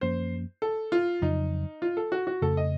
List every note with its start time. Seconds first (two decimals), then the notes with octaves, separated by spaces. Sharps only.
0.01 F#2 F3 A#3 C#4 C5
0.62 A4
0.92 F4
1.22 F2 C#3 F#3 D#4
1.82 F4
1.97 A4
2.12 F#4
2.27 F#4
2.42 F2 C#3 A3 A4
2.57 D#5